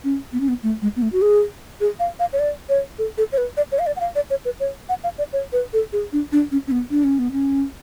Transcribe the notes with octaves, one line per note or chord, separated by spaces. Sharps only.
C#4
B3
C#4
B3
A3
G#3
B3
A3
F#4
G#4
G#4
F5
F5
C#5
D5
C#5
A4
A4
C#5
B4
D5
C#5
F5
D5
F#5
F5
D5
C#5
B4
C#5
F#5
F5
D5
C#5
B4
A4
G#4
D4
D4
C#4
C#4
B3
D4
C#4
B3
C#4